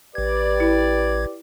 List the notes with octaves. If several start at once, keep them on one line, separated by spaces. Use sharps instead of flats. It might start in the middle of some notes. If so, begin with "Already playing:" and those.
A1 G4 B4 D5 G#6
E4 B5